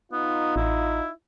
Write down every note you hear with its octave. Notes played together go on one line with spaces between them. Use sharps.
B3 D#4 F4
A1 E4